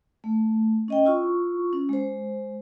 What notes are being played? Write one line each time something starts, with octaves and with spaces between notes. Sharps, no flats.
A3
C#4 D#5 G5
E4 F4 C#6
C#4
G#3 C5